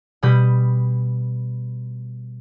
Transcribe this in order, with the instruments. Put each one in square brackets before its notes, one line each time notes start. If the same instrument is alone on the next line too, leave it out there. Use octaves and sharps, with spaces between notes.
[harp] B2 G3 G4 B5 D#6 G6